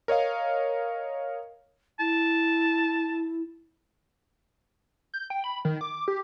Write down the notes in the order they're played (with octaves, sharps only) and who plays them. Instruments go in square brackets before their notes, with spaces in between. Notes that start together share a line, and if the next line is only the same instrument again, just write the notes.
[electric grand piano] A#4 C#5 D#5 F5
[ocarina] E4 [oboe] A5
[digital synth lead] G6
G5
B5
D#3
D6
G4